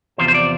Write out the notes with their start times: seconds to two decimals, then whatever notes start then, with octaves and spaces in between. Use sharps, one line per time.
0.18 E2 C3 F3 C5
0.28 C5
0.34 D5